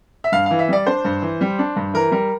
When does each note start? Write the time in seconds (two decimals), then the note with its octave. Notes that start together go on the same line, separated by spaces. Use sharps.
0.24 E5
0.32 G2 F5
0.46 E3 F5
0.59 E5
0.69 G3 D5
0.86 D4 C5
1.05 G2
1.22 E3
1.41 G3
1.59 D4
1.76 G2
1.94 E3 A#4
2.12 G3 A#4